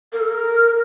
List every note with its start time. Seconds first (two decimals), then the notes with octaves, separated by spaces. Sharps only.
0.13 A#4
0.20 A4
0.28 A#4